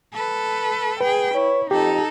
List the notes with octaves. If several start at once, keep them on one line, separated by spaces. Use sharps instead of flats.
A4 B4
G#4 B4 G5
E4 C#5
F2 D#4 G4 A4